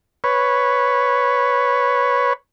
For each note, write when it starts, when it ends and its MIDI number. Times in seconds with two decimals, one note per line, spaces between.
0.24 2.33 71
0.24 2.33 73